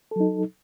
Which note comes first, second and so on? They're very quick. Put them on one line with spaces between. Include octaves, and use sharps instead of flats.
A4 F#3 D#4